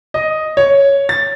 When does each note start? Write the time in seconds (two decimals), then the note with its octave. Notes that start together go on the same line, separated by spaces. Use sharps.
0.14 D#5
0.57 C#5
1.09 A6